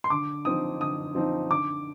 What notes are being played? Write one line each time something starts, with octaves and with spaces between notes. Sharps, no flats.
C6
D3 D6
F3 C4 D#4 D#6
D3 D#6
F3 C4 D#4
D3 D6